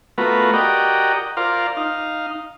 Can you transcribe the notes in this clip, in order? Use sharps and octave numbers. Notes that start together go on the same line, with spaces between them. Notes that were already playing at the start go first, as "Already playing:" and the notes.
A3 B3 F4 F#4 A#4 B4
F#4 G4 A#4 D5 D#5
F4 A#4 C5 D5 F5
D#4 F5